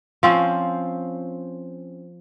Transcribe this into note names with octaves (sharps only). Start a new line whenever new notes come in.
F3 C4 C#4